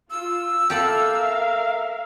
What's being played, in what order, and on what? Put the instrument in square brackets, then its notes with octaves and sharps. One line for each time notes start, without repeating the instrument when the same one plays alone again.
[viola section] F4 [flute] E6
[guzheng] G4 A4 B5 [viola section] A#4 E5 F5